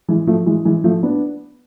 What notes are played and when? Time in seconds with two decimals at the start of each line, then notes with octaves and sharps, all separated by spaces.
0.08 E3 G#3
0.27 F3 A3
0.46 E3 G#3
0.65 E3 G#3
0.84 F3 A3
1.03 B3 D4